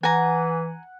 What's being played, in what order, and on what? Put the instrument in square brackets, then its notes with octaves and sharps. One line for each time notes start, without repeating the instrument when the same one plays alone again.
[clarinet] E3 [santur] F#5 [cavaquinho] G#5 A#5